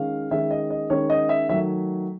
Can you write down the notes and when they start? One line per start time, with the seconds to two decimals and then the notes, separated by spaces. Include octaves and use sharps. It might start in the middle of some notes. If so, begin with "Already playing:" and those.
Already playing: D#3 G#3 C#4 F5
0.31 D#3 G#3 C#4 E5
0.51 D#5
0.70 D#5
0.90 D#3 G#3 C#4 C#5
1.10 D#5
1.29 E5
1.49 D#3 F#3 A3 E5